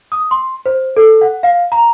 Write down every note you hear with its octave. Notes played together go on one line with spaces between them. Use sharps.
D#6
C6
C5
A4
F#5
F5
A#5